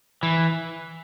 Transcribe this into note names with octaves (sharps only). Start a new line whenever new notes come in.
E3